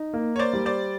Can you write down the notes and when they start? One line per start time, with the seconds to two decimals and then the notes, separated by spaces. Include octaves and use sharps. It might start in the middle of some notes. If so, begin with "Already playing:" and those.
Already playing: D#4
0.14 A#3
0.36 C#5
0.39 C5 D5
0.53 G3
0.66 C5 D5